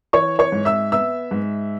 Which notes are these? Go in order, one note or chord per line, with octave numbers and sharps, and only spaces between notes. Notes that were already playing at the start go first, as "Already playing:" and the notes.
E3 C#5 C#6
C#5 C#6
G#2
E5 E6
B3 E5 E6
G#2